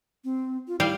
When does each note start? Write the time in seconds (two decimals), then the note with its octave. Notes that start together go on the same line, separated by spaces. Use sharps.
0.24 C4
0.68 F4
0.80 G3 E4 F5 G5